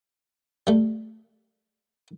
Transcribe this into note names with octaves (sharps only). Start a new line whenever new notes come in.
G3 A3